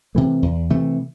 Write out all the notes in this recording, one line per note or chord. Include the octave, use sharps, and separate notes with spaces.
C3 E3 A3
E2
C3 E3 A3